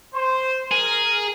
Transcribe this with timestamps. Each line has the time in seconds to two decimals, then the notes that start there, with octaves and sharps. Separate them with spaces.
0.14 C5
0.71 G#4 A#4